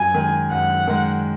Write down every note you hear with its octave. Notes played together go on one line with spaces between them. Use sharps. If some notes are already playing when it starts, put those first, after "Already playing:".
Already playing: F#2 G#5
D#3 G#3
F#2 F#5
D#3 G#3